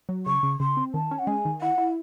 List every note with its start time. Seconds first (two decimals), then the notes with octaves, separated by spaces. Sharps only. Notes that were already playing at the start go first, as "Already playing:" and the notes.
0.09 F#3
0.26 C#3 C#6
0.43 C#3
0.60 C#3 C6
0.77 C4
0.94 D#3 A5
1.11 C#4
1.19 F#5
1.27 G#3 G#5
1.45 D#3
1.61 E4 F#5
1.78 E4